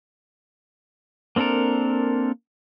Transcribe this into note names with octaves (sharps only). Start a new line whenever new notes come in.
A#3 C4 D4 A4 A#4